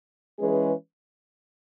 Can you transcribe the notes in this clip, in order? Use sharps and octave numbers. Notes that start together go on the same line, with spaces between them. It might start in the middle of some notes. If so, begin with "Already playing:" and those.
E3 G#3 C#4 G#4 B4